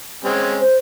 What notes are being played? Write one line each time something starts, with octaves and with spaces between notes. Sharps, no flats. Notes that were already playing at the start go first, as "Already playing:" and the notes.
G#3 C4 C#4
C5